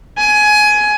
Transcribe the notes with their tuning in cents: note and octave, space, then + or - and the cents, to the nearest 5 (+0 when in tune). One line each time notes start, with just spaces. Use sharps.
G#5 +20